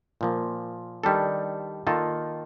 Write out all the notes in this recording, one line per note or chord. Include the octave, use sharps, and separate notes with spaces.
A#2 F3 A#3
D#3 G3 D4 A4
D#3 A#3 F4 A4